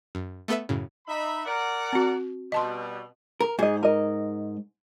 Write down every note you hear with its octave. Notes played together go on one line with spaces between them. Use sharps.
F#2
A3 B3 A4 B4 E5
F#2 A2 C#3
D#4 E5 B5
A#4 D5 F#5
C4 F#4
B2 G3 D#5 A5 C6
A#4
G#2 G#4 D#5
A#4 D#5